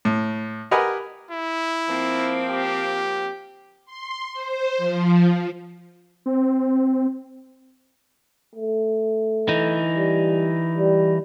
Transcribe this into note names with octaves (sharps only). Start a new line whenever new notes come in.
A2
G4 A#4 B4 D#5 F#5 G#5
E4
F3 A#3 C4
G4
C6
C5
F3
C4
A3
E3 D#4
G3
G3